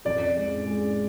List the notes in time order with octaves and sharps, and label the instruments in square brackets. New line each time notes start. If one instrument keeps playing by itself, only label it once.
[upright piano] F2 [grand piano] D5
[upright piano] G#3
G#3